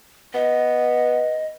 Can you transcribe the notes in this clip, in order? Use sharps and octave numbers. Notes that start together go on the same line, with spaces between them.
B3 D#5